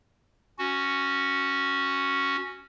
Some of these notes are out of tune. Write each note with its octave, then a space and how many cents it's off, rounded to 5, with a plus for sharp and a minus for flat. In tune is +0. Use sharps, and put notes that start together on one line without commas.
C#4 +0 F#4 +0